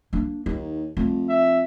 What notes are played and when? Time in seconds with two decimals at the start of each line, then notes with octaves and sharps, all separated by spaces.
0.13 A#3 D4
0.46 D#2 D#4
0.97 F2 A3
1.29 E5